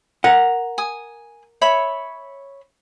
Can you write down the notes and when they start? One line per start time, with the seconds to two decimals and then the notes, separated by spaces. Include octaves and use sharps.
0.24 A#4 F#5
0.78 G#5 D#6
1.61 C#5 E5 B5